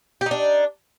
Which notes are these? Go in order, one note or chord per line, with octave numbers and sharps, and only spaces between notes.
D4 D#4 G4